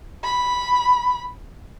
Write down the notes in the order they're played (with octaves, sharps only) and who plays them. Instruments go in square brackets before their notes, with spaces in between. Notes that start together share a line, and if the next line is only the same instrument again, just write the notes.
[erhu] B5